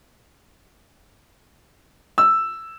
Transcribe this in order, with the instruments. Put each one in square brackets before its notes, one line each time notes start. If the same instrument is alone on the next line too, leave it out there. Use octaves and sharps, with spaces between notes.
[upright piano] E6